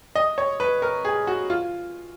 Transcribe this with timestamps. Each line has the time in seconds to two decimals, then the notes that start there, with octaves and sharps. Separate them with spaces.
0.15 D#5
0.38 C#5
0.60 B4
0.82 A#4
1.05 G#4
1.27 F#4
1.50 F4